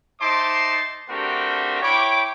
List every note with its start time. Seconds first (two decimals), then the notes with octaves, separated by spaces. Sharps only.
0.20 D#4 C5 E5 A5 C6 D6
1.09 A3 C4 D4 F#4 G4 A#4
1.82 E4 C#5 G5 B5 D6